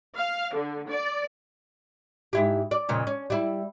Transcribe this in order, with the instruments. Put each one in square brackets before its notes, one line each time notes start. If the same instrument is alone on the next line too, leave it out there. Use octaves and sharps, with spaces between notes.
[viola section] F5
D3
D5
[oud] G#2 E4 G4
D5
F2 A#2 C#3
C#4
G3 E4